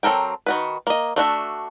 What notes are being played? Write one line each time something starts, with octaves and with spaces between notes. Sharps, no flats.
F#3 C4 A4 A#4 G5
D#3 F#4 B4
A#3 D#5
A3 D4 F#4 E5